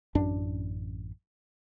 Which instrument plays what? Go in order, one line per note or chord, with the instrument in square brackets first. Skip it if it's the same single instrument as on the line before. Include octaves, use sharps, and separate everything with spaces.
[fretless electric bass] A1 F#2 D4